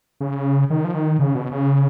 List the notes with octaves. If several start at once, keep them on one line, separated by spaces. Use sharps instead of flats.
C#3
D#3
F3
D#3
C#3
B2
C#3